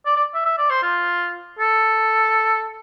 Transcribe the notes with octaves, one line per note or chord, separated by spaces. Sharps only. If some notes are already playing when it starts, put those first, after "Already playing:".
D5
D5
E5
E5
D5
C5
F4
A4